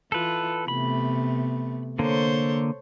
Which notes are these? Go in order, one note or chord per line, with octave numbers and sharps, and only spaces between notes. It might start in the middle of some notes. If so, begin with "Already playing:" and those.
E3 F4 A4 B4
C3 A3 B3 B5
D3 A#3 A4 C5 C#5